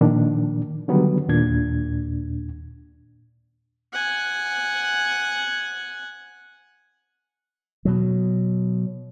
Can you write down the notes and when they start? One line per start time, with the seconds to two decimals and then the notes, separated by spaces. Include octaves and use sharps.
0.01 A#2 D#3 F3 D4
0.88 D3 D#3 F#3 G3 B3
1.28 D#2 A#2 D4 G#6
3.93 F#5 G#5
7.85 B2 F#3